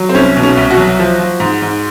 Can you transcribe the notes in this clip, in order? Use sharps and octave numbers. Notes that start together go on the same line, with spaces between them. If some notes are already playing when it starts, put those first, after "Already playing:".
Already playing: F#3
C4
C2 C#4
B2
C#4
C2
F#4
F#3
F3
F3
G#2
G#2